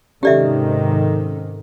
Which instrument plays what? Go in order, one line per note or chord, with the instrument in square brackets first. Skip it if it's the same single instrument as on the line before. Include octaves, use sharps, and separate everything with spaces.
[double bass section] G#2 C3 D#3 [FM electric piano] C#4 A4 [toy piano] G4 D5 E5